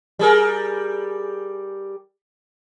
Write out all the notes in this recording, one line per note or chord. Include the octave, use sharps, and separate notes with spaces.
G3 G#4 A#4